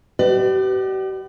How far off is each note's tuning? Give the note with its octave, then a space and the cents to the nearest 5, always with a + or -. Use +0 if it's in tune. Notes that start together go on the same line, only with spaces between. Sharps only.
G4 -45 B4 +25 D5 +30